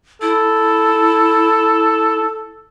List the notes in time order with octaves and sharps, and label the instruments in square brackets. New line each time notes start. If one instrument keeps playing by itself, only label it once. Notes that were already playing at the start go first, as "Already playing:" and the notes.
[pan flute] E4 [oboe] A4